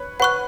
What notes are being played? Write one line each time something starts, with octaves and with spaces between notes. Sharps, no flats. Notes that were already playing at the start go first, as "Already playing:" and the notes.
Already playing: B4 C#5
B4 F#5 C#6 F#6